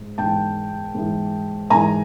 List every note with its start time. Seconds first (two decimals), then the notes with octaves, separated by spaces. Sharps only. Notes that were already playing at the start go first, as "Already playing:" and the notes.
Already playing: G#2
0.18 G#2 E3 G5 A5
0.95 G#2 E3
1.70 G#2 E3 G#5 A#5